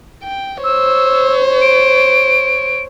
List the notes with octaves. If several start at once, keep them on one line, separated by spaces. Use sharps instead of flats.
G5
C5 C#5 E6
D7